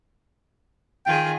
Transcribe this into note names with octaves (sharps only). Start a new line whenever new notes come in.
D#3 F4 G#4 G5